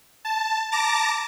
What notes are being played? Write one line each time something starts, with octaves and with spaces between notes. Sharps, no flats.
A5
A5 A#5 D6 A#6